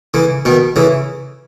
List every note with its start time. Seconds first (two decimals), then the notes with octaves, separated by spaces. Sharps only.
0.14 C#3 E3
0.45 B2 D#3
0.76 C#3 E3